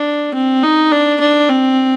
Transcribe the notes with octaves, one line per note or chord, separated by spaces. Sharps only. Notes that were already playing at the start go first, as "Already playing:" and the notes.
Already playing: D4
C4
D#4
D4
D4
C4